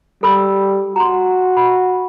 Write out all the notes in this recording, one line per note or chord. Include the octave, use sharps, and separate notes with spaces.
G3 A4 B5 E6
F#4 A#5 C6
B5